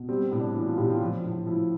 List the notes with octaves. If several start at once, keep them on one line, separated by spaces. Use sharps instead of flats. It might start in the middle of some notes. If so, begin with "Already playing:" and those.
Already playing: B2
G3 C4
A2
D4
E3
F4
A2 G4
F4
F3
A2
F3 E4